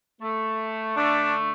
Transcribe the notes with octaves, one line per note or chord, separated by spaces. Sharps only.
A3
D3 A3 D4